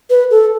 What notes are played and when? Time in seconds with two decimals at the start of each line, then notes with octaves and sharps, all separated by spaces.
0.10 B4
0.31 A4